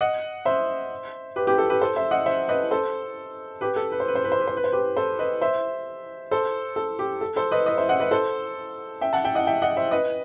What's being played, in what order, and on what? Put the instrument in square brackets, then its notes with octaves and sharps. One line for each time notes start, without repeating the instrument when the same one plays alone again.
[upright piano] D#5 F#5
C5 E5
G4 B4
G4 B4
A4
G4 B4
A4 C5
C5 E5
D#5 F#5
C5 E5
B4 D#5
A4 C5
G4 B4
A4
B4
C5
B4
C5
B4
C5
B4
C5
B4
C5
G4 B4
A4 C5
B4 D#5
C5 E5
A4 C5
A4
G4
A4
A4 C5
B4 D#5
B4 D#5
C5 E5
D#5 F#5
B4 D#5
A4 C5
E5 G5
F#5 A5
E5 G5
D#5 F#5
E5 G5
D#5 F#5
C5 E5
B4 D#5